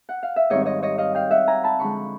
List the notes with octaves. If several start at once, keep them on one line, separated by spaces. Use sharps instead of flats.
F#5
F5
E5
G#2 D#3 G3 C4 C#5 D#5
C#5 D#5
C#5 D#5
D#5 F5
F5 G5
E5 F#5
G#5 A#5
A5 B5
D3 F3 G#3 B5 C#6